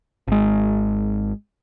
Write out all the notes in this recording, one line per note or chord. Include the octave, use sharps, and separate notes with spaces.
G#1 G#3